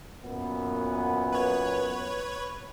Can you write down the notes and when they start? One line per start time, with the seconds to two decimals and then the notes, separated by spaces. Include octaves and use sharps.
0.23 F#2 A#2 B3
1.33 B4 C#5